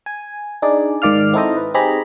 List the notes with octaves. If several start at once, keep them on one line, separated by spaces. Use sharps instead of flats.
G#5
D4 D#4 G#4 D5
G#2 D#3 D5 F5 F6
C4 D#4 E4 A4 C5 D#5
B4
C4 D#4 G4 G#4 A#5 B5